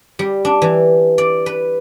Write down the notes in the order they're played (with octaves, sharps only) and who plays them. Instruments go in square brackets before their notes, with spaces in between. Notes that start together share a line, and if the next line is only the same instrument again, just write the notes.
[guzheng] G3
D4
E3
D5
B4